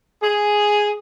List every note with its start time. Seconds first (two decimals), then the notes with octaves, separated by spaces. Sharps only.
0.22 G#4